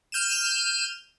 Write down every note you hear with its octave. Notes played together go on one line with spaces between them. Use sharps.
F6 G6 D#7 E7